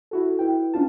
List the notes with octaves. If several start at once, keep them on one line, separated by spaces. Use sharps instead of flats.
E4 F#4 A4
E4 B4 G5
C#4 D4 F4 A5